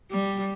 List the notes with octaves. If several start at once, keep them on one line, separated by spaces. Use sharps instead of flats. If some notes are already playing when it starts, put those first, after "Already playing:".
G3